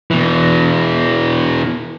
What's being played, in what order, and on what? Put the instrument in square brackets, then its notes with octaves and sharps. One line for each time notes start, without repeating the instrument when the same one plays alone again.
[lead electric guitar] B2 E3